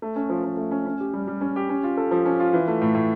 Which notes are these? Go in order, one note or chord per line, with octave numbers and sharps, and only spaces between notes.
A3
C#4
F3
F3
A3
C#4
C#4
G4
G3
G3
C#4
G4
C#4
F4
A4
F3
C#4
F4
E3
A3
A2
A2